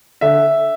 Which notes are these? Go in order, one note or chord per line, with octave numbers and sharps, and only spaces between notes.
D3 E5